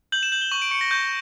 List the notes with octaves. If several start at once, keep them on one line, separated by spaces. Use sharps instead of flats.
G6 F#7
E7
G6 F#7
G7
C#6 F#7
D7
C#6 C#7
A#6
C#6 G6